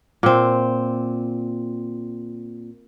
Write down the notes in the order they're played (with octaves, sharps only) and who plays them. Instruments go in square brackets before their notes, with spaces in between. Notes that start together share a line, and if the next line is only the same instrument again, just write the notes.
[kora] A#2 C4